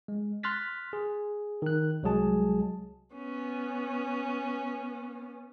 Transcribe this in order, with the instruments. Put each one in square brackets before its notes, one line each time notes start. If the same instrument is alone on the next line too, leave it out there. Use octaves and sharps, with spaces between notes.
[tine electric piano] G#3
C6 F6 F#6 A6 B6
G#4
D#3 F#6
C2 F#3 G#3 G#4 A5
[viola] B3 C#4